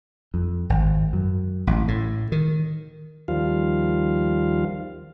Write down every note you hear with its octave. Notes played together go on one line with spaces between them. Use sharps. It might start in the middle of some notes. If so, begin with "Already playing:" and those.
F2
G#1
F#2
A1
A2
D#3
D#2 D#3 F3 G3 F4 F5